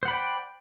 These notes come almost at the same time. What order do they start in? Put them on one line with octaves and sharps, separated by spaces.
C5 F#5 B5 D5 G5